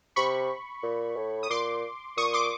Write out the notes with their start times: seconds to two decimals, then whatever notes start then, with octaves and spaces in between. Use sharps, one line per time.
0.16 C3 B5 C#6
0.83 A#2
1.17 A2
1.43 D#6
1.50 A#2 C6 D6
2.17 A#2 C#6 D#6
2.33 C6 D6